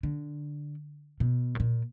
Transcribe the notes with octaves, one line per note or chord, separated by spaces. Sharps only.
D3
B2
A2
A#2